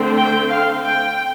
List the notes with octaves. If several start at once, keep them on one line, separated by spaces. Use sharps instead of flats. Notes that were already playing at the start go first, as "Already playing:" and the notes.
Already playing: D3 A3 C4
G5
F5
G5